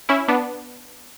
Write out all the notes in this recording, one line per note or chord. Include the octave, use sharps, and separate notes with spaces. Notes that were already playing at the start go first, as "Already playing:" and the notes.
C#4 E4
B3 D4